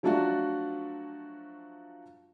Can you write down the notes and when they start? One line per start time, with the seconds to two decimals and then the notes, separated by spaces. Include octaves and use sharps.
0.03 F3 F#3 A3 D4 F4 F#4